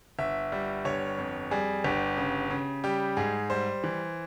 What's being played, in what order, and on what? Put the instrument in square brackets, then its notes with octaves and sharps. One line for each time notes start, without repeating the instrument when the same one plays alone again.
[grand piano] G1 E5
G3
G1 C#5
F2
G3 G#4
G1 G4
C#3
C#3
G3 G4
G#2 G#4
G3 C5
E3